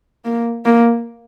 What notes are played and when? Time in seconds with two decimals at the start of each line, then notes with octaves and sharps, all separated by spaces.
0.25 A#3
0.65 A#3